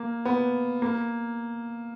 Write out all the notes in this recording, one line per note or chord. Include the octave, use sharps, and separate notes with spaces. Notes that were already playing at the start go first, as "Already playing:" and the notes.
Already playing: A#3
B3
A#3